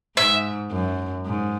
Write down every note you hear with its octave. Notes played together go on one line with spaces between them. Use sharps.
G#2 E5
F#2
G#2